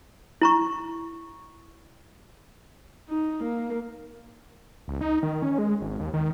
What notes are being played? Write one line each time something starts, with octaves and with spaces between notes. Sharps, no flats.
E4 A#5 C#6
D#4
A#3
C#2
D#4
D#3
C#4
G#3
G#1
D#2
D#3